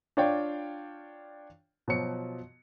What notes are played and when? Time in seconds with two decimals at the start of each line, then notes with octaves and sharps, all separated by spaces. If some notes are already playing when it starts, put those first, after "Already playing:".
0.17 D4 F4 C#5 D5 F5 G5
1.88 B2 F3 F#3 C#7